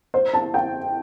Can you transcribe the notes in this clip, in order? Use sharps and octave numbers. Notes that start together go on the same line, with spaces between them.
C5
A5
G5